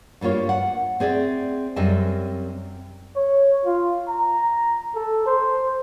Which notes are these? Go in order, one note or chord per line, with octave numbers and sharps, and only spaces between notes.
G2 G3 A#3 F4 C#5
F#5
C4 G#4 D5 E5
F#2 G3 C4 D#5 E5 G#5
C#5
F4
A#5
A4
C5